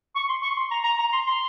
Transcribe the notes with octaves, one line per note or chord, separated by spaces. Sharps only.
C#6
C6
C#6
C6
A#5
A#5
A#5
C6
C6